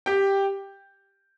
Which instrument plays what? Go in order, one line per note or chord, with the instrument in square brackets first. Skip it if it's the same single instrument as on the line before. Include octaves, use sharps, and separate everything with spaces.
[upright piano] G4 G5